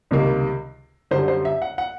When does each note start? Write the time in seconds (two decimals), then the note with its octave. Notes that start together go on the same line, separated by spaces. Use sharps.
0.11 C#2 C3 D#3 G3 A#3
1.11 F#2 D3 G3 C5
1.28 C5
1.45 E5
1.62 F#5
1.78 F#5